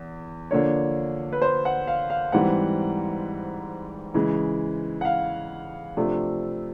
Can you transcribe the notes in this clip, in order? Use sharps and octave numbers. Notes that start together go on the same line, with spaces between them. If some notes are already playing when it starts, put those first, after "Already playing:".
Already playing: E2
D3 F3 A#3 D4 C#5
B4
C5
F#5
F5
F5
G#2 E3 G3 C4 F#5
C#3 E3 G#3
F#5
F5
C3 F3 A3 D4